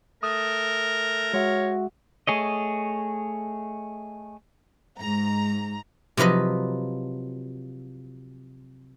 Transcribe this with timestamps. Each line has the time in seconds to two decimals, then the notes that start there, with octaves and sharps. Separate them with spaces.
0.23 A3 A#4 D#6
1.34 G#3 F#4 C#5 E5
2.27 A3 G#4 C#5 D#5
4.99 G#2 A#5
6.17 C3 F3 F#3 B4 D#5